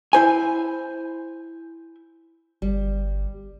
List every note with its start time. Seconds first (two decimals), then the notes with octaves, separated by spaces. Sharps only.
0.13 E4 C5 G#5
2.62 G1 G3